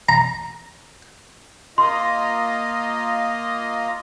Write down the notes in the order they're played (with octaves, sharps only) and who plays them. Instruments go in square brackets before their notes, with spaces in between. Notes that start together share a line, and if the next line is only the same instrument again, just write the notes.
[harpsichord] A#5
[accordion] A#3 F4 D#5 [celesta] C6